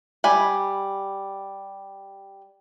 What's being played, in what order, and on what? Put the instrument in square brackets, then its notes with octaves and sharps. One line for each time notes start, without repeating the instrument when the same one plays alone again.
[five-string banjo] G3 G#5 B5